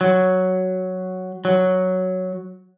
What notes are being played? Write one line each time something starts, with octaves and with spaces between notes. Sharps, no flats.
F#3
F#3